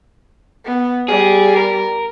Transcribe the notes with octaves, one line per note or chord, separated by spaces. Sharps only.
B3
G3 G#4
A#4